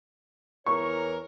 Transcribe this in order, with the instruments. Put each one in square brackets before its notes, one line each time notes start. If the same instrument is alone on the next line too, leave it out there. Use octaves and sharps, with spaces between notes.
[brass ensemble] E2 E3 A#4 [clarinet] C#5 [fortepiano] C#6